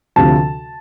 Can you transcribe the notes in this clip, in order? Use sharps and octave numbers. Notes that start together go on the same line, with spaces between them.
D2 C3 F3 A5